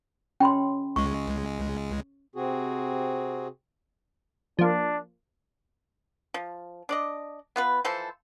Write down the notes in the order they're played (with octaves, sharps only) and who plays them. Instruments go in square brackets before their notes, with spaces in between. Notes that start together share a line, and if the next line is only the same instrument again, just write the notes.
[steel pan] C#4 [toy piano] G5 B5 C6
[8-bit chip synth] C#2 G#3 [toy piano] C#6
[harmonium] C3 C4 F#4 G#4
[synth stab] F3 A#3 [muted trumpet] D4
[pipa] F3
D4 D5 D#5
B3 F4 B4
E3 F3 A4 C5